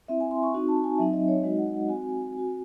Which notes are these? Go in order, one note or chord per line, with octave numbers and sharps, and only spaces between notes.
C4 E4 E5
G#5
C6
C#6
C4 D#4 F#4
A5
G#5
F#3 C4 D#4 E5
D#5
C#5
G#3 D#4 F#4 D#5
F#5
F#5
C4 F#4 G#5
C4 F#4